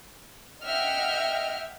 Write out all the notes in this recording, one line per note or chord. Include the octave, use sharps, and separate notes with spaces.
D#5 E5 F#5 G5 F6